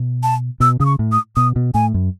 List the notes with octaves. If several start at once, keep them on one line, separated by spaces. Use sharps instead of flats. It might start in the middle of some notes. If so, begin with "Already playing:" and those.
Already playing: B2
A5
B2 E6
C#3 D#6
C#6
A2
D#6
B2 D#6
B2
A2 G#5
F#2